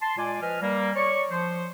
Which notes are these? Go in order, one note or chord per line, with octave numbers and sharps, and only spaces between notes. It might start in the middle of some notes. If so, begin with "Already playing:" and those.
A5 C6
A#2 G#3 D5 G#5
F3 B4 D#5 G#5 F6
G3 A#3
C#5 D5 C#6
F3 C5